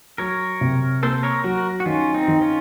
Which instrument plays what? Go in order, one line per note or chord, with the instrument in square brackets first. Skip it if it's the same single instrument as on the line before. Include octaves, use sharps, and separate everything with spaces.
[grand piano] F#3 [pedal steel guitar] A#4 C#5
[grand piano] C3
[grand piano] A#3 [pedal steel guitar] A4 C5
[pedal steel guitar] A#4 C#5
[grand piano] F#3 [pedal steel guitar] F#4 A#4
[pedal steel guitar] F#4
[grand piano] D#3 [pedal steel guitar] C#4 F4
[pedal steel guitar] C4 D#4
[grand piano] D#3
[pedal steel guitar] C#4 F4